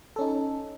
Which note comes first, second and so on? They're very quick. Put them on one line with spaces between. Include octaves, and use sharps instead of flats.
A4 C#4 D#4